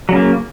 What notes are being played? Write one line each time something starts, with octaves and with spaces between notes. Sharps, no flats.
C#3 F#3 A#3